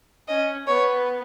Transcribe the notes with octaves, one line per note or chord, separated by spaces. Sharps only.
C#4 D#5
B3 C#5